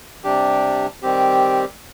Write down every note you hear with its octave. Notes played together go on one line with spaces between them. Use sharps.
C3 G3 D4 G4
D#3 G3 C4 G4